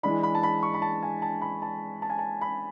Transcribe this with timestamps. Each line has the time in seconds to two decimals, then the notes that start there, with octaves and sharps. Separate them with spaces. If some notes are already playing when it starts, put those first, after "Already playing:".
0.03 E3 G#3 D4 B5
0.23 B5
0.35 A5
0.43 B5
0.63 C#6
0.74 B5
0.82 A5
1.03 G#5
1.22 A5
1.42 B5
1.62 A5
2.02 A5
2.10 G#5
2.19 A5
2.41 B5